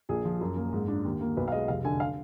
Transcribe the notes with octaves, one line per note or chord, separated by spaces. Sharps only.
A#1 G#4
F3
F#2
A#3
G#2
D4
D#2
A#3
B1 B4
F5
G#3 D#5
F1 F5
D3 G#5
F5